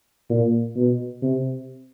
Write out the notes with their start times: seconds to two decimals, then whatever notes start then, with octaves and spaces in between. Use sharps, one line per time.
0.29 A#2
0.76 B2
1.22 C3